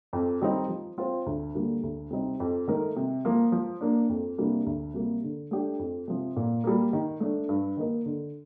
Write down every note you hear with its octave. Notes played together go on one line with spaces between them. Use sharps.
F2
D#3 G3 C4 D#4
F3
C4 F4 C5
D2
D3 G3 A#3
D2
C3 G3 C4 D#4
F2
D#3 A3 D#4 A#4
C3
F3 A#3 F4
F3
A#3 D4
F2
C3 G3 A#3 D4
D2
C3 G3 A#3
D3
A3 D4 G4
F2
C3 F3
A#2
G3 A#3
D#3
A3 D4
G2
D#3 A#3 D#4 A#4
D3